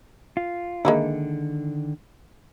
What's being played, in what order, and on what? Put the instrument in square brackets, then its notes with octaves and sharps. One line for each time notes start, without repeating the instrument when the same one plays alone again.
[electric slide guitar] F4
[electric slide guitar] D3 D#3 [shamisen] G#3 A#3 E4